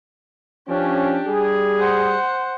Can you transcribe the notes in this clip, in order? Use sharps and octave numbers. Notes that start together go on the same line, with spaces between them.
F3 C#4 D4 G4
G3 G#4
C5 F#5